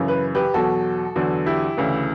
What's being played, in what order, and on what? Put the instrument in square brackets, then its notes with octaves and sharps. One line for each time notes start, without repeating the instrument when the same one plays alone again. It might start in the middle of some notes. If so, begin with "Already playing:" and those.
Already playing: [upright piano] F#2 C#3 E3
B4
G4 B4
E2 B2 F#3 F#4 A4
E2 D3 F#3
E4 G4
D2 C#3 E3